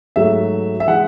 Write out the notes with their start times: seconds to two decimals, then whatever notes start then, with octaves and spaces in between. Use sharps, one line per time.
0.16 G#2 F#3 A3 E5
0.80 E5
0.88 E3 G#3 F#5